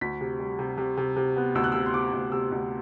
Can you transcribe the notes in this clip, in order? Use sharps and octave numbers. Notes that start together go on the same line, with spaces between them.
D2 B6
C3
G3
C3
C3
C3
C3
B3
D2 E6
F#6
C3 E6
C6
C3 D6
D2
C3 E6
D2